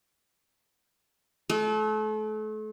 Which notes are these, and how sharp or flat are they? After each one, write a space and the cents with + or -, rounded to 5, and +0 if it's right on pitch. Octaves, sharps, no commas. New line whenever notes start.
A3 -35